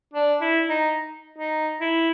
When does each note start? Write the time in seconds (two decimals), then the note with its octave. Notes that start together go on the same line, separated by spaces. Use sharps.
0.13 D4
0.41 E4
0.69 D#4
1.38 D#4
1.80 E4